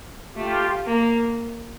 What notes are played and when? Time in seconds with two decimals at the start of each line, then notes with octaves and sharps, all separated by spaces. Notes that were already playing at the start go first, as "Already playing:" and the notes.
0.36 A3 F4 G4
0.86 A#3